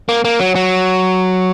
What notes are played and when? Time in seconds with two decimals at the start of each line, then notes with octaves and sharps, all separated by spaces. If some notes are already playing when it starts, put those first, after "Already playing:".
0.09 A#3
0.25 A#3
0.40 F#3
0.55 F#3